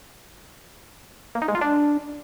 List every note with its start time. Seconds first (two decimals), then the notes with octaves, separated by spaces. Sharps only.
1.35 A#3
1.42 D#4
1.48 G#3
1.55 F4
1.61 D4